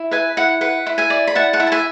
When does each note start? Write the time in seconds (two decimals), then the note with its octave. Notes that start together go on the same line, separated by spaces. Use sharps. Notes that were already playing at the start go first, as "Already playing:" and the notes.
Already playing: E4
0.11 B4 E5 G#5
0.37 E4 F#5
0.61 B4 F#5
0.86 E4
0.98 E5 G#5
1.10 D5
1.27 B5
1.35 E4 F#5 A5
1.53 F#5 A5
1.60 E4
1.67 A5
1.72 E5 G#5